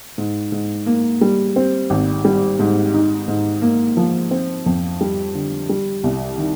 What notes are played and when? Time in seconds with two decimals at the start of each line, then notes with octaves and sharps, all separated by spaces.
0.18 G#2
0.52 G#2
0.86 A#3
1.21 G3
1.56 C4
1.90 G#1
2.25 G3
2.59 G#2
2.94 D#4
3.28 G#2
3.62 A#3
3.97 F3
4.31 C4
4.66 F2
5.01 G3
5.35 D3
5.69 G3
6.04 C2
6.38 D#3